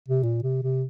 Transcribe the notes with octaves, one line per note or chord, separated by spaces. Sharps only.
C3
A#2
C3
C3